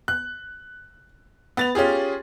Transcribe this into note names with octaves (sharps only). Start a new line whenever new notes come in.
F#6
B3 A6 F7
C#4 F4 G4 G#4